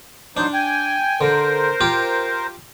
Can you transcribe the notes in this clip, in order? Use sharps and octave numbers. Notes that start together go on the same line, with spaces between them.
F#3 D4 D#4 C5
G5 G#5
D3 A#4 C5
F4 G4 F5